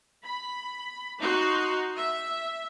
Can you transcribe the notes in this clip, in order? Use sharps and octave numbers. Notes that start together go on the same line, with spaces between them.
B5
D#4 F#4 C6
E5